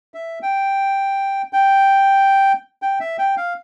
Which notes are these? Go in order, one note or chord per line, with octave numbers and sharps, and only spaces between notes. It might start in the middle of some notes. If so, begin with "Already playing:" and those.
E5
G5
G5
G5
E5
G5
F5